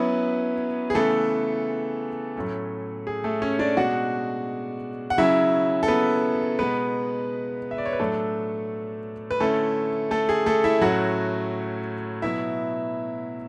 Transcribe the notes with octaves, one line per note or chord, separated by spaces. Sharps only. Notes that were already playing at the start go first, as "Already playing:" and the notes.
Already playing: F#3 B3 C#4 E4 B4
G#4
C#3 E3 A3 B3 A4
A2 F#3 A3 C#4
G#4
A3 A4
C#4 C#5
D4 D5
B2 G#3 D4 F#4 F#5
F#5
C#3 F#3 C#4 E4 E5
A4
B3 B4
B2 G#3 B3 B4
E5
D5
C#5
B4
A2 F#3 A3 D4 A4
B4
D3 A3 C#4 E4 A4
A3 A4
G#4
A3 A4
E4 E5
A2 F#3 A3 C#4 F#4 F#5
B2 F#3 B3 E4 E5